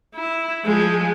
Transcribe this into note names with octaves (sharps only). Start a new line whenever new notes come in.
E4
F3 G#3